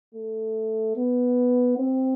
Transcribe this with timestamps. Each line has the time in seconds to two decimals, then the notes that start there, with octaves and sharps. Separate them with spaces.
0.14 A3
0.96 B3
1.78 C4